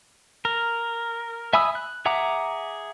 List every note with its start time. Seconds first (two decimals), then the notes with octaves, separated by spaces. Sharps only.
0.45 A#4
1.53 E5 G#5 B5 D#6 E6
1.75 F#6
2.06 G#4 E5 F#5 A#5 D6